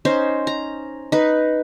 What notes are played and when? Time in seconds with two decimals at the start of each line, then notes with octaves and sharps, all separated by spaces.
0.05 C#4 D#4 C5
0.47 A#5
1.12 D#4 B4